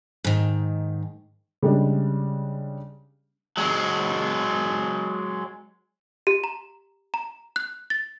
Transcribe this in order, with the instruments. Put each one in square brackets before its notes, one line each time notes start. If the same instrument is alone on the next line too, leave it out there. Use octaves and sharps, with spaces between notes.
[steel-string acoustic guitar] G#2 D#3
[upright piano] C#3 G3 G#3 D4
[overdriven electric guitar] F#3 G#3
[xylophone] G4
A#5
A#5
F#6
A6